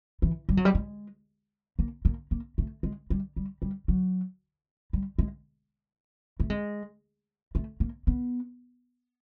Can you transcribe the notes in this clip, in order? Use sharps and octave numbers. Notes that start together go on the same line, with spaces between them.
E3
G3
F#3
G3
G#3
A#3
A#3
A#3
A3
G#3
G3
G3
G3
F#3
G3
G#3
A3
G#3
A3
A#3
B3